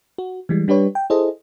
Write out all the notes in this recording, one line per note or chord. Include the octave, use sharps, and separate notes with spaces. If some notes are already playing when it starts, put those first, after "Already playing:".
F#4
E3 G3 G#3
G3 D4 G4 B4 C#5
G5
E4 G#4 A4 C5 D#5